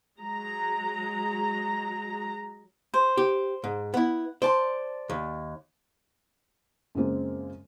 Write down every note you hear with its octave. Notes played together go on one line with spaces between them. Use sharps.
F#3 G#3 A#5
C5
G4
G#2
B3 E4 F#5
C5 D5 A5 C6
D#2
F#2 C#3 G#3 A#3 C4 F4